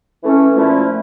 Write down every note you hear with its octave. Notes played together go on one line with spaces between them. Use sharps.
E3 A3 C#4 E4
A#2 F3 A3 C#4 E4